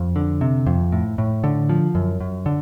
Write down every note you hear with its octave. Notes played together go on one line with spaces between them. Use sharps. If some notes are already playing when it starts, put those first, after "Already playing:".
Already playing: F2
D3
C3
F2
A2
A2
D3
F3
F#2
F#2
D3